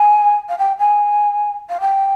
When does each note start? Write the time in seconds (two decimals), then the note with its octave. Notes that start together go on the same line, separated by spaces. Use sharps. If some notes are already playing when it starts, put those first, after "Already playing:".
Already playing: G#5
0.49 F5
0.58 G5
0.79 G#5
1.69 F5
1.80 G5